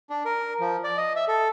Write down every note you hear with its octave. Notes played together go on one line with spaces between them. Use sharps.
D4
A#4
F3
D5
D#5
E5
A4